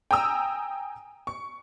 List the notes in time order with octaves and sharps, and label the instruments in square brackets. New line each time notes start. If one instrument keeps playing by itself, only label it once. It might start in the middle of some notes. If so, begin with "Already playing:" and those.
[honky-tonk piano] G5 G#5 A#5 D#6 E6
C#6